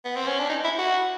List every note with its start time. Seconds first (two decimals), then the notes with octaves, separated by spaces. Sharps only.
0.05 B3
0.16 C4
0.27 C#4
0.39 D4
0.49 D#4
0.64 E4
0.79 F#4